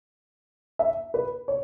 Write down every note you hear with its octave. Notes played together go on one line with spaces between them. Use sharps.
E5
B4
C#5